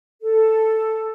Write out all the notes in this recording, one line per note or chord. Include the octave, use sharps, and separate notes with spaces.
A4